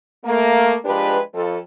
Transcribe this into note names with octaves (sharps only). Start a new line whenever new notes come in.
A3 A#3
F3 G#3 D4 G4 B4
F2 A4